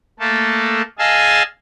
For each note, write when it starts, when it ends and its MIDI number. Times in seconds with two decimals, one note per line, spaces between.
0.20 0.82 57
0.20 0.82 58
0.20 0.82 69
0.99 1.43 68
0.99 1.43 75
0.99 1.43 77
0.99 1.43 80
0.99 1.43 81
0.99 1.43 88